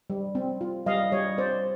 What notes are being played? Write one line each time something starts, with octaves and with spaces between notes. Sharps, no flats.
G3
C4
F4
G3 D#5 F5
G3 C#5 D#5
C4 C5 D5